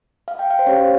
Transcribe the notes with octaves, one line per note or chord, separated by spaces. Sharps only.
F5
G5
F5
C5
C#4 G4 C#5